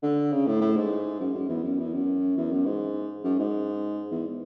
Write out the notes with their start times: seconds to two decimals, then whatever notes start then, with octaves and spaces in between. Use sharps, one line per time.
0.03 D3
0.32 C#3
0.47 A2
0.61 A2
0.77 G#2
1.20 F#2
1.35 F#2
1.49 E2
1.64 F#2
1.78 E2
1.93 F#2
2.37 E2
2.52 F#2
2.66 G#2
3.24 F#2
3.39 G#2
4.11 E2